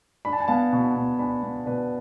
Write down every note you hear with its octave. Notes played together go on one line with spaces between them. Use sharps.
D4 B5
A5
G#5
B3 F5 A5
B2
B2
D4 G#5 B5
B3
B2 B4 D5